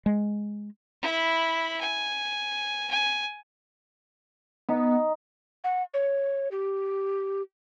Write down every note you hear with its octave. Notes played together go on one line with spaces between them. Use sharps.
G#3
E4 B5
G#5
G#5
B3 D#4
F#5
C#5
G4